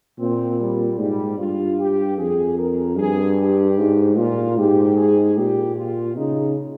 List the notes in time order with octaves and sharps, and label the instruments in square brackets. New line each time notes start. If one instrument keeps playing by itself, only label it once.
[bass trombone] A#2 [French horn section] C4
[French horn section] G3
[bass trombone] G#2 [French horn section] G3
[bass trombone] G2 [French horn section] F4
[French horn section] G4
[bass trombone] F2 [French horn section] G#4
[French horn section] A#4
[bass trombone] G2 [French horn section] G#4
[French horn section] G4
[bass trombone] G#2
[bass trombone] A#2 [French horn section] F4
[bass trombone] G#2 [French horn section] G4
[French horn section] G#4
[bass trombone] A#2 [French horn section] G4
[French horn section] F4
[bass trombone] C#3 [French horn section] D#4